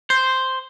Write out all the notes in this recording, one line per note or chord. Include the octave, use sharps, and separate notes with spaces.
C5